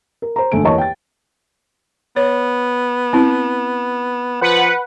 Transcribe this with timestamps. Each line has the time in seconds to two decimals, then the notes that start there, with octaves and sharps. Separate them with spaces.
0.22 A#4
0.36 C5 A#5
0.52 G#1 D3 A3 G#5 D7
0.63 E2 A#3 C#5 D#5 A5 C#6
0.78 G5 A6
2.16 B3 C#5
3.13 C4 E4
4.41 F3 B4 F#5